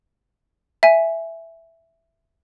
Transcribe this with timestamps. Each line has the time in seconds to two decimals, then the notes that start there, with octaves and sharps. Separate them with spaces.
0.83 E5 G#5